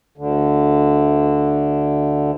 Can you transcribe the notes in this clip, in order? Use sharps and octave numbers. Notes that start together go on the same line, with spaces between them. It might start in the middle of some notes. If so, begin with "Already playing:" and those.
D2 D3